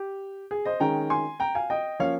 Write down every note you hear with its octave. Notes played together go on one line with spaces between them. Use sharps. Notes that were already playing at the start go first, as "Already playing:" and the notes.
Already playing: G4
G#4
C5 D#5
D#3 G#3 C#4 G5 A#5
G#5 C6
G5 A#5
F5 G#5
D#5 G5
F3 A#3 C#4 C#5 F5